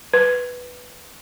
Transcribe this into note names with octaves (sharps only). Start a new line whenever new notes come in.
B4